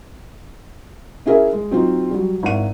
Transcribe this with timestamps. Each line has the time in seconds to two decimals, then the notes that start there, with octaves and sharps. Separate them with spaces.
1.26 C#4 E4 G#4 A#4 E5
1.53 G#3
1.71 F#3 C4 D#4 F4
2.11 F#3 G3
2.43 G#1 E4 F#5 D#7